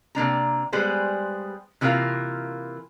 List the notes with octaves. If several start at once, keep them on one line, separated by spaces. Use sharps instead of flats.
C3 A#3 D4 A#5
G3 G#3 B3 G#4 C5
C3 E3 A#3 F4 A#4 F5